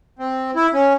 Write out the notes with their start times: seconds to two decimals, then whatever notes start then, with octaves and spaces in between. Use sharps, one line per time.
0.19 C4
0.56 E4
0.74 C#4